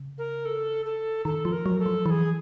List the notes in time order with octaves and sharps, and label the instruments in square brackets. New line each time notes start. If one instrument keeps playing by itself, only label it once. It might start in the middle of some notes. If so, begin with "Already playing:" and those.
Already playing: [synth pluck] C#3
[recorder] A#4
A4
A4
[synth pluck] D#3 [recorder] A4
[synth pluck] F3
[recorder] A#4
[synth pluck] F#3
[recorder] A4
[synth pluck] F3
[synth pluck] E3 [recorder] A4
[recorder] G#4